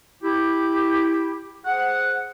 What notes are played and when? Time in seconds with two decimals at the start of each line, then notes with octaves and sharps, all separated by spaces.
0.23 E4 G4
1.66 G#4 C5 F#5